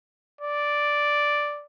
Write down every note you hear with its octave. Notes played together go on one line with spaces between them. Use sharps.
D5